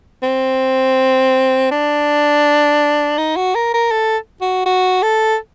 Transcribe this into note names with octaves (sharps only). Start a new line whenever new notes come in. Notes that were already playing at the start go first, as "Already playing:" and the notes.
C4
D4
D#4
F#4
A#4
A#4
A4
F#4
F#4
A4